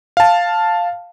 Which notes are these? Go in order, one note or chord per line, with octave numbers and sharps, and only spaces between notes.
F5 A5